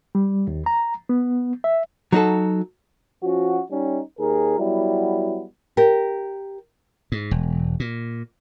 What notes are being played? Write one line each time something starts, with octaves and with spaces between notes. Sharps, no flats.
G3
D#2
A#5
B3
E5
F#3 D#4 F#4 A4
F3 C#4 F#4
G3 C#4 D#4
D#2 G#4 A#4
F#3 G3 B3 E4
G4 A#4
G#2
E1
A#2